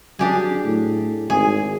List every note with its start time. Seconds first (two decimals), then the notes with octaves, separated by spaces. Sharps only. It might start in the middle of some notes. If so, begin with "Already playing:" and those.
0.19 F#3 D4 G4 G#4
0.64 A2
1.30 G#1 G#4